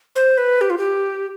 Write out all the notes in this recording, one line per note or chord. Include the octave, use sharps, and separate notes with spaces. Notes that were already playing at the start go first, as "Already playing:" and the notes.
C5
B4
G4
F4
G4